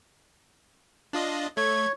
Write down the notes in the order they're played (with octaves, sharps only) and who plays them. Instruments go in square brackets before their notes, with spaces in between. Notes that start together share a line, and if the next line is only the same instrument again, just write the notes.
[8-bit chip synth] D4 F4 D#5
[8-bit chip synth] A3 G#6 [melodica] C#5